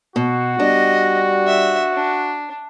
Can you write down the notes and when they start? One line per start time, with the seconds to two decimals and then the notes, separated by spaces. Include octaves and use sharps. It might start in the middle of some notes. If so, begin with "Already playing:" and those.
0.16 B2 F#4
0.60 G3 D4 D#5
1.47 E5
1.93 D4